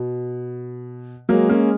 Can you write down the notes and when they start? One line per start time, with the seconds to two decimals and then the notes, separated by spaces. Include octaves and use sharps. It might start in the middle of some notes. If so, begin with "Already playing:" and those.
Already playing: B2
1.29 F#3 G#3 A#3
1.49 A#3 C#4